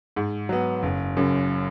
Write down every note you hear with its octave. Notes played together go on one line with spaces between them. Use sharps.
G#2
F#3 B3
F#1
F#2 C#3